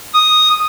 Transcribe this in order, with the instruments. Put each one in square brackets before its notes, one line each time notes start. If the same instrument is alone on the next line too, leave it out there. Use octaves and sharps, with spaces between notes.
[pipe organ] D#6